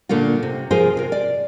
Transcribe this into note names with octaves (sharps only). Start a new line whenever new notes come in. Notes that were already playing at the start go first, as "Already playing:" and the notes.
A#2 D3 A3 A#3 F4
C3
F3 F4 G#4 A#4 C5
C3 A#4
D5